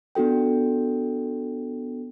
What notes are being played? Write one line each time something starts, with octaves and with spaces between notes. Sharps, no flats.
B3 D4 F#4 A4 G5